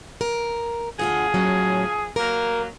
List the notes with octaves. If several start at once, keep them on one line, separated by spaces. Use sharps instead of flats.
A#4
D2 F3 F4 G#4 F#5
A2 F#3 C#4
F#3 A#3 A#4